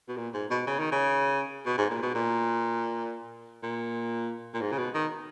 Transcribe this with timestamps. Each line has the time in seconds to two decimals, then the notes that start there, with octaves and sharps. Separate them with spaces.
0.08 B2
0.17 A#2
0.34 G#2
0.51 B2
0.67 C#3
0.79 D#3
0.92 C#3
1.66 B2
1.78 G#2
1.90 A#2
2.03 B2
2.15 A#2
3.63 A#2
4.54 A#2
4.61 G#2
4.72 C#3
4.78 B2
4.95 D#3